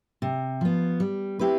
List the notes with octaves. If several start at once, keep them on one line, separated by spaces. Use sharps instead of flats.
C3
F3 B3
G3
C4 E4 G4 B4